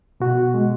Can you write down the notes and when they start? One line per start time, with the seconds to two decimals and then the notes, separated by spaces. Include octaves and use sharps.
0.20 B2 F#4
0.54 G#3